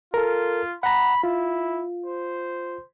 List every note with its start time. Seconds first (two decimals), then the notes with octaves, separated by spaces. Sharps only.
0.14 F4 A4 A#4
0.83 F#5 A#5 B5
1.24 E4 F4
2.06 C5